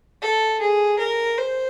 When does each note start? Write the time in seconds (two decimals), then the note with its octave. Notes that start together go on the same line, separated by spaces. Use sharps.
0.22 A4
0.60 G#4
0.99 A#4
1.38 C5